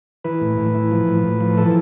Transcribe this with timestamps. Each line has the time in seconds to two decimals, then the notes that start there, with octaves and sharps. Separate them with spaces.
0.24 E3 B4
0.41 A2
0.58 A2
0.75 E3
0.91 F3
1.08 A2
1.24 A2
1.40 F3
1.57 E3 A4